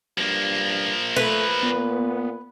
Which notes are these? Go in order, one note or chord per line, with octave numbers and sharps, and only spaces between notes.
G2 F3 A#3
A3 B4
A#2 B3